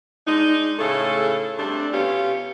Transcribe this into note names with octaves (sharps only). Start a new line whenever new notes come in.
G#3 D4 D#4
A2 C#3 A3 G#4 A4
C3 G3 A3 D4
B2 C#4 F4 G4